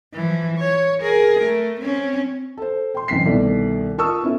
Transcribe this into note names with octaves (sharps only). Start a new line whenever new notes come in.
E3 F3
C#5
G#4 A#4
A3
C4 C#4
A4 C5
G5 C6
A1 F#2 C3 B6 C7
C2 B2 D#3 A3 D5
F4 A#4 A5 C#6 D#6 E6
B3 C#4 E4 A4